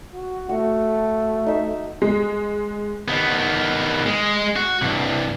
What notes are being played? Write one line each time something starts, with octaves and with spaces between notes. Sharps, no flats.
F#4
A3 F#4
D#4 E5
G#3
D#3 B3
G#3
F#4
C2 G2